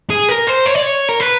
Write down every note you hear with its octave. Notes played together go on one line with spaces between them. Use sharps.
G#4
A#4
C5
C#5
D5
C#5
A#4
B4